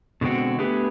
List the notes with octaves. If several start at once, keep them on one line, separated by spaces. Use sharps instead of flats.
B2 D3 G#3 C4 F#4
A3 B3 D4 G4 G#4 B4